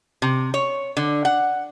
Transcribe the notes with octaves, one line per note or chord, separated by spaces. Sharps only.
C3
C#5
D3
F#5